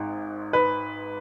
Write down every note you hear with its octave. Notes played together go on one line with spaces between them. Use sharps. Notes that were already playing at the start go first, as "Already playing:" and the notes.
Already playing: G#1 G#2
B4